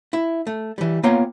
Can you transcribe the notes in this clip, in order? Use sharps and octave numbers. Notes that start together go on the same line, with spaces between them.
E4
A3
E3 G3
A#3 B3 F4 C#5 G5 A#5